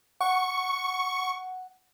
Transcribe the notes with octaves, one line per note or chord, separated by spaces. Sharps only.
F#5 C#6